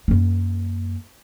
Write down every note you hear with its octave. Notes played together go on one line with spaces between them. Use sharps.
F#2 A#3